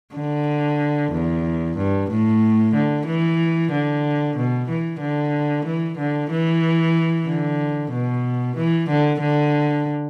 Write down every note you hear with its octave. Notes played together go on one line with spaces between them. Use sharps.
D3
E2
G2
A2
D3
E3
D3
B2
E3
D3
E3
D3
E3
D3
B2
E3
D3
D3